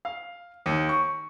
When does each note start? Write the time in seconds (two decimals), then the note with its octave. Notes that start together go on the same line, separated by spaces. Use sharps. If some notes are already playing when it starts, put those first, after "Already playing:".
0.05 F5
0.66 D#2
0.89 C#6